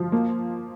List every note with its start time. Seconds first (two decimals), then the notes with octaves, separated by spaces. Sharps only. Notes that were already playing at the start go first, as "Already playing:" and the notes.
Already playing: F3
0.12 A#3